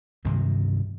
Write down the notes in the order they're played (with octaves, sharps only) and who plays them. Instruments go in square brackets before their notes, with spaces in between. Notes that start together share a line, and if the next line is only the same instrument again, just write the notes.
[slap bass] G2 C3 D#3 F#3